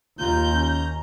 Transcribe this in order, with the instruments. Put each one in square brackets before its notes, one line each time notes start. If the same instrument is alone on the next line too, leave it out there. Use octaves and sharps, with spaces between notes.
[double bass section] D#2 [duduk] F4 [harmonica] A#5 [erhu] G6
[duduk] C#4